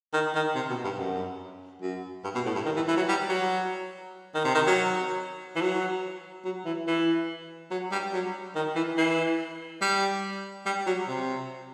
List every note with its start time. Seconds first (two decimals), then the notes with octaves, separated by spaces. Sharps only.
0.13 D#3
0.35 D#3
0.55 C3
0.70 B2
0.84 G2
0.98 F#2
1.82 F#2
2.24 G2
2.35 B2
2.45 A2
2.55 G2
2.65 D#3
2.76 E3
2.88 E3
2.97 F#3
3.08 G3
3.29 F#3
4.34 D#3
4.45 C3
4.55 D#3
4.66 F#3
5.56 E3
5.61 F#3
6.44 F#3
6.65 E3
6.87 E3
7.71 F#3
7.92 G3
8.13 F#3
8.55 D#3
8.75 E3
8.97 E3
9.81 G3
10.66 G3
10.86 F#3
11.08 C3